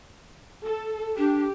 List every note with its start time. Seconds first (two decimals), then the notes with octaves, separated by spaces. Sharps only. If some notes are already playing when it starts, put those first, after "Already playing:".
0.63 A4
1.17 D4 G4